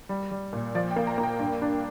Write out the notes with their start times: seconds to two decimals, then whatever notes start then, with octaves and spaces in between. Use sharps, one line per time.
0.09 G3
0.31 G3
0.53 A#2
0.75 F3 D5
0.91 G5
0.96 A#3
1.07 A#5
1.18 A#3
1.23 G5
1.40 G2
1.62 D4